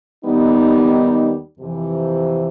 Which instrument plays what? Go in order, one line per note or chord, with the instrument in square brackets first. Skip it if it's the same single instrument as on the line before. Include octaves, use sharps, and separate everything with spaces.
[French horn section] D#2 D#3 G3 B3 D#4
F2 C3 E3